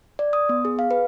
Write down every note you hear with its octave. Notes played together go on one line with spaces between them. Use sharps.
D5
D#6
B3
G#4
F5
B4